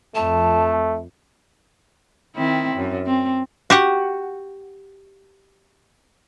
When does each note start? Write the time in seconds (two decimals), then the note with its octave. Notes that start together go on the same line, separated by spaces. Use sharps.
0.15 F2 A3 A5
2.36 D#3 C4 E4
2.76 F#2
3.06 C4
3.70 F#4 G4 F#5